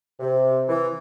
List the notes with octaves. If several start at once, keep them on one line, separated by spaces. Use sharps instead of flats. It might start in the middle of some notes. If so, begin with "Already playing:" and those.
C3
E3